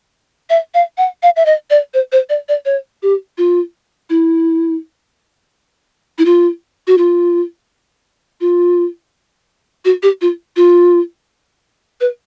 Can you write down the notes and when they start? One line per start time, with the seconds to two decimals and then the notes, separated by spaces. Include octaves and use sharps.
0.50 E5
0.74 F5
0.98 F#5
1.23 F5
1.36 E5
1.46 D#5
1.70 D5
1.94 C5
2.12 C5
2.29 D5
2.49 D5
2.65 C#5
3.03 G4
3.38 F4
4.10 E4
6.18 E4
6.25 F4
6.87 F#4
6.98 F4
8.41 F4
9.85 F#4
10.03 G4
10.21 F4
10.56 F4
12.01 B4